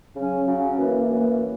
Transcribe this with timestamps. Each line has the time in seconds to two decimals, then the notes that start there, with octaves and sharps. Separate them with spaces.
0.14 C#3 F#3 C#4
0.47 C#3 F#3 C#4
0.78 F#2 E3 A#3
1.11 F#2 E3 A#3